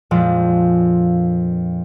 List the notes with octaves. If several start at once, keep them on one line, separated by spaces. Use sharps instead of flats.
F2 A#2 F3 G#3 D4